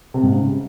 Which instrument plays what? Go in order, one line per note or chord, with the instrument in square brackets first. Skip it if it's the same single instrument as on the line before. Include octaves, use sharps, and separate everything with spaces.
[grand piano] C3
G#2
C#3